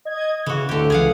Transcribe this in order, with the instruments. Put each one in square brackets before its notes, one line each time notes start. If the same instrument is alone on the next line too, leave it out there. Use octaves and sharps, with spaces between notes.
[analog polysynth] D#5 G#6
[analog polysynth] C#3 [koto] E3 F#4
[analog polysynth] D2 A2 [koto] D3 G4
[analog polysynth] C#2 E3 [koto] G#4 F5 F#5